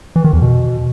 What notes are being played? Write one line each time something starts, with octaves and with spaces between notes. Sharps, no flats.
E3
D#3
E2
B2